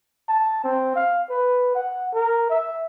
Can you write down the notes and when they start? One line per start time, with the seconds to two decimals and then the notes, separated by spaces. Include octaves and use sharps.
0.29 A5
0.64 C4
0.96 F5
1.30 B4
1.75 F#5
2.14 A#4
2.50 E5